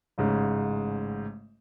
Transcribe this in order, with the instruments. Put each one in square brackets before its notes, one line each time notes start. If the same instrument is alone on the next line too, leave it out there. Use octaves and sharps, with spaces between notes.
[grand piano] A1 G#2 C#3